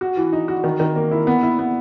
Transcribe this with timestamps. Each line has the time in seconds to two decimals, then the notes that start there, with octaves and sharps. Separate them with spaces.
0.01 F#4
0.17 E3
0.33 D#4
0.48 F#4
0.64 D#3
0.80 D#3
0.96 A#3
1.11 E4
1.27 B3
1.43 E4
1.59 B3